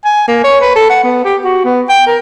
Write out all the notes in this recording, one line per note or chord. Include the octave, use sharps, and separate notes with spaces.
G#5
A#3
C#5
B4
A4
F#5
B3
G4
F#4
B3
G5
A#4